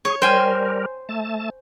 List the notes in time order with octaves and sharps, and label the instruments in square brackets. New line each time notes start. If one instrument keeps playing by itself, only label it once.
[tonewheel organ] G#4 C#6 [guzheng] C#5
[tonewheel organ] G3 A#4 [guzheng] C5 G5 G#5
[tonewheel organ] A3 A5